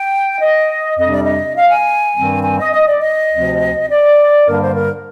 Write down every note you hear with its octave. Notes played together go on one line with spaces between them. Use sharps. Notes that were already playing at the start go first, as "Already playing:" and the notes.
Already playing: G5
D#5
F2 C3 G3 D4 D#5
D5
D#5
F5
G#5
G2 D#3 G3 C4
G#5
D#5
D#5
D5
D#5
D2 C3 F3 C4
D5
G2 D3 G3 A#3 D4 A#4
C5
A#4